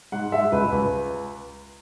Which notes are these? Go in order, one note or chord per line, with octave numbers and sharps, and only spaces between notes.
G#2 F#5
G#3 E5
C#2 B4
C#2